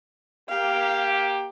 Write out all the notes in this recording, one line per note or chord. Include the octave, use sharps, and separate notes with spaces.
A#3 G4 F5